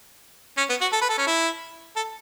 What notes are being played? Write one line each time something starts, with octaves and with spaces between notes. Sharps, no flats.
C#4
B3
F#4
A4
B4
A4
C#4
E4
A4